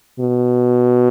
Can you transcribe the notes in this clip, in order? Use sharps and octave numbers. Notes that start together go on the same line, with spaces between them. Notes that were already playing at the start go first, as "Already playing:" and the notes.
B2